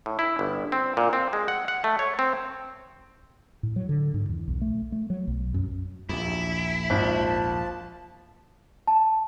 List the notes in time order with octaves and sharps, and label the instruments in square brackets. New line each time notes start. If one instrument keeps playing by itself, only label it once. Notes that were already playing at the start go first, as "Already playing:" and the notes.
[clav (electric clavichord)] A2
E4
G1
C4
A#2
C4
G#3
F#5
F#5
A3
C#5
C4
[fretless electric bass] A2
F#3
D3
G#2
E2
B1
A3
A3
F#3
B1
F#2
[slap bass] A#1 D#2 [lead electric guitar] E4
[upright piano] G#1 [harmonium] F3 A5
[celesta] A5